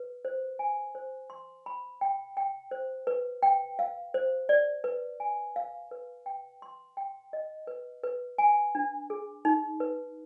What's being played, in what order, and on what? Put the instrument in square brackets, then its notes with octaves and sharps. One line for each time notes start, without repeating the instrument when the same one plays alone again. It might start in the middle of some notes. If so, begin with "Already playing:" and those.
Already playing: [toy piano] B4
C5
G#5
C5
C6
B5
G5
G5
C5
B4
G5
F5
C5
D5
B4
G#5
F5
B4
G5
C6
G5
D#5
B4
B4
G#5
D4
G#4
D#4
B4